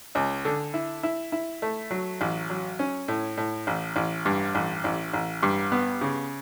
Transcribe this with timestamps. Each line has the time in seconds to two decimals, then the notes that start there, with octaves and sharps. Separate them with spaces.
0.15 C#2
0.45 D3
0.74 E4
1.03 E4
1.32 E4
1.62 A3
1.91 F#3
2.21 A1
2.50 F#3
2.79 C#4
3.08 A2
3.37 A2
3.67 A1
3.96 A1
4.25 G2
4.55 A1
4.84 A1
5.13 A1
5.43 G2
5.72 B3
6.01 C#3